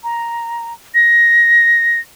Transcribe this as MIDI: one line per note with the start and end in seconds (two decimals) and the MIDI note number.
0.04 0.74 82
0.95 2.00 94